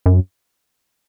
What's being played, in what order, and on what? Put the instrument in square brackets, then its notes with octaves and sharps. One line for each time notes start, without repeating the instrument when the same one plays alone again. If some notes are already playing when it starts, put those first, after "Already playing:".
[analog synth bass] F#2